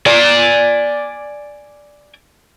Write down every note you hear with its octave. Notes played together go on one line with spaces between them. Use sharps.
D5 G#5